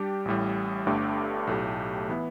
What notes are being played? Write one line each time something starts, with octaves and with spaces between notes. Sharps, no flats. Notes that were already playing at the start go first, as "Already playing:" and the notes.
Already playing: G3 D4 G4
A1 A2 G3
G1 G2 D3 A3 G4
B1 A2 A3 G4
E3 B3 E4